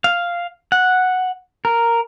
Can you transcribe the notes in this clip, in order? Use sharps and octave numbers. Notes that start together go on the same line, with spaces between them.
F5
F#5
A#4